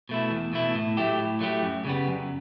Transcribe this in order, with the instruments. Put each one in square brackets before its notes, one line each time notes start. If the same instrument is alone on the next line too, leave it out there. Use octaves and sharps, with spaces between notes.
[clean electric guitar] B2 A3 E4
E2
B2 A3 E4
A2
F#3 A3 E4 G4
A2
F#3 A3 E4 G4
F#2
C#3 G3 B3
F#2